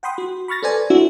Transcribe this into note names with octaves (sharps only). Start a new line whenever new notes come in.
F#5 G5 B5 C6 D#6
F#4
B5 C#6 F6 A6 A#6
A4 B4 C5 D5 G#5
D4 E4 F#4 E5